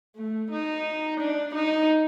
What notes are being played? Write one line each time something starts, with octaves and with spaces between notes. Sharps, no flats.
A3
D#4
D4
D#4